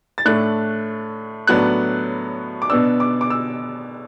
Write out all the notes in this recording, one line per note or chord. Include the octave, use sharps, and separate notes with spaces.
A6
A2 A3 D4 F#6
A2 F#3 B3 D4 F#6
D6
B2 B3 D4 E6
D6
D6
E6